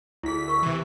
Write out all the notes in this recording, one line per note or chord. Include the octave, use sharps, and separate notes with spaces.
D2 E4 G#4 B6
A#4 C#6 E6
C3 E3